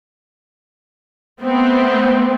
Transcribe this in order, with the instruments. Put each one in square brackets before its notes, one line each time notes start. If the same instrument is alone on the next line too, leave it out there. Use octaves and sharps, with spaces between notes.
[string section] A3 B3 C4